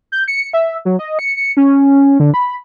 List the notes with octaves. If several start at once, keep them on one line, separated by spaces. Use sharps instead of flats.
G6
C#7
E5
F#3
D#5
C#7
C#7
C#4
D3
B5